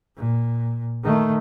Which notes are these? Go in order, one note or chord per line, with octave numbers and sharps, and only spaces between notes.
A#2
D#3 A3